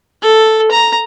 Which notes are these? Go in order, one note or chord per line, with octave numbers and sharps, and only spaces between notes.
A4
A#5